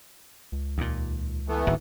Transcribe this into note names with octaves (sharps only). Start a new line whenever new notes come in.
C#2
D#2 A#2
E3 A3 B3
D1 G#1 D#3